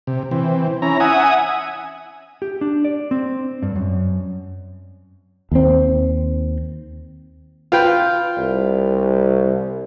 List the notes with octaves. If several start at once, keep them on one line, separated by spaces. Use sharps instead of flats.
C3
E3 C4
C#4 E4 A#5
E5 F#5 G#5 D#6
G4
D4
D5
C4
G2
F#2
D#2 C4
F4 B4 G5
C2